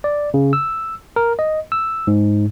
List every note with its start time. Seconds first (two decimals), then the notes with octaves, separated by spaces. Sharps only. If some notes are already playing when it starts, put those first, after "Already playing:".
0.04 D5
0.34 C#3
0.53 E6
1.16 A#4
1.39 D#5
1.72 E6
2.07 G#2